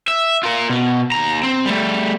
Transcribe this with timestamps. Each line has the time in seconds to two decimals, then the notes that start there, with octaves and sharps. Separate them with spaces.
0.08 E5
0.43 F4 A#4
0.70 B2
1.12 D#2 A#5
1.43 C4
1.66 G3 A3